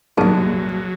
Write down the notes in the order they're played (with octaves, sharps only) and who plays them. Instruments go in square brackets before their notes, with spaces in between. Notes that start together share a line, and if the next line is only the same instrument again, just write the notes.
[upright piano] C2 A#2 [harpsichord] F#2 D#3 [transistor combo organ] F#3 [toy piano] G#4 B4 A5